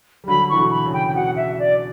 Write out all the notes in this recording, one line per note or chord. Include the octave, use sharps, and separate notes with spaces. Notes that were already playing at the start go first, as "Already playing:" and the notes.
G3
D3 F#3 B5
E3 C#6
B2 D3
B5
C#3
G5
G5
B2 F#5
E5
D5